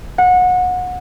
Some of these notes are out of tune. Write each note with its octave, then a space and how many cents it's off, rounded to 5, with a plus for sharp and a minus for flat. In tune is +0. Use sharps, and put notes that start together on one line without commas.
F#5 -25